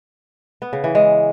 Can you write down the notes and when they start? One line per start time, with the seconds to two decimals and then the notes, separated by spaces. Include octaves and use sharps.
0.62 B3
0.73 C#3
0.84 E3
0.95 G#3